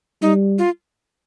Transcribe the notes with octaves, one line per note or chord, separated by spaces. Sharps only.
G3 D#4
F4